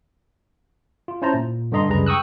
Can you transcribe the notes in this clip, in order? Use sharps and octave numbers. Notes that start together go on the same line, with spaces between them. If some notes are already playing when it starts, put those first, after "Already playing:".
F4
C#4 E4 C5 A5 A#5
A#2
G2 D3 D4 D#5 A#5 C6
C#2 F#2 G3 G#4 B4 A#5
G5 C#6 D#6 E6 F#6